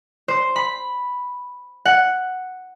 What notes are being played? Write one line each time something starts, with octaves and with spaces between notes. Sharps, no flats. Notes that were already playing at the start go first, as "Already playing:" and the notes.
C5
B5
F#5